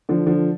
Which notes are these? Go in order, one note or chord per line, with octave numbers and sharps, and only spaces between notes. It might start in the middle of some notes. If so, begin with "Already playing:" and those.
D3 F3
D3 F3